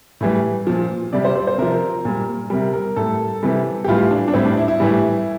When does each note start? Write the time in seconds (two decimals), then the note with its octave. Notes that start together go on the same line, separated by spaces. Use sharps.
0.21 A2 E3 G3
0.67 A#2 F3
1.13 C3 G3 D5
1.25 C5
1.35 C5
1.47 C5
1.58 C3 F3 A#4
2.05 A#2 G3
2.50 C3 G3 A#4
2.73 A#4
2.96 A2 G3 A4
3.43 C3 E3 G3
3.84 G4
3.88 A2 E3 G3 F4
4.11 D4
4.28 D4
4.34 A2 G3 C4
4.45 D4
4.57 E4
4.68 E4
4.80 A2 E3 G3